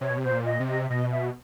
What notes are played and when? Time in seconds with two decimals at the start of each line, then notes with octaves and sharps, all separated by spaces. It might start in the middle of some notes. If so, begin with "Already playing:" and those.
0.01 C3 C#5
0.10 B2
0.17 C3
0.23 B2 C5
0.31 A#2
0.45 D#5
0.60 C3
0.67 D#5
0.83 E5
0.89 B2 D#5
1.12 E5